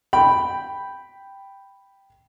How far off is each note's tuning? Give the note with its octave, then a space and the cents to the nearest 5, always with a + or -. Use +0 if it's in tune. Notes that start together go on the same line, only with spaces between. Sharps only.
G5 +0 B5 +0